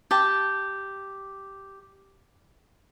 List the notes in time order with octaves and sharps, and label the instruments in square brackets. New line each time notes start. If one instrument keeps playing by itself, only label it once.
[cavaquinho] G4 A5